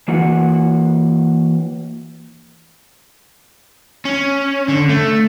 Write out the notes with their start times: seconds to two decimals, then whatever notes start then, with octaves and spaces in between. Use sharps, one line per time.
0.08 E3 A#3 F#4 F#5
4.05 C#4
4.68 D3
4.89 A3